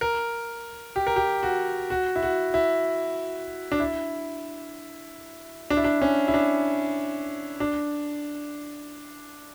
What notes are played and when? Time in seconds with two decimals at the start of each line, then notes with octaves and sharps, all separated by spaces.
0.01 A#4
0.96 G4
1.07 A#4
1.16 G4
1.43 F#4
1.90 F#4
2.16 E4
2.23 F#4
2.54 E4
3.72 D4
3.80 E4
5.70 D4
5.77 E4
5.84 D4
6.02 C#4
6.28 E4
6.34 D4
7.60 D4